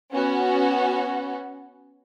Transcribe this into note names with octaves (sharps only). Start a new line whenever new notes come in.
B3 C#4 F#4